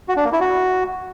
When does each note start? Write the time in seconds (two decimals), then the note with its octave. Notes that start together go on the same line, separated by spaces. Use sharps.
0.09 F#4
0.17 D4
0.25 A#3
0.33 E4
0.41 F#4